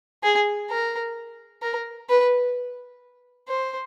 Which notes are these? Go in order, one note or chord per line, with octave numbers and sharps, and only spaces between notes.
G#4
A#4
A#4
B4
C5